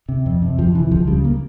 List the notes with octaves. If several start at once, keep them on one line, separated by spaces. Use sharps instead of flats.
C3
F2
C3
F2 F3
C3 E3
C#2 F3
C#3 G3
A#3